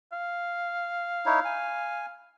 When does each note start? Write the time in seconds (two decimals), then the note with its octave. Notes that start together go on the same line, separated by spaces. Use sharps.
0.12 F5
1.26 D#4 E4 C#5
1.45 G#5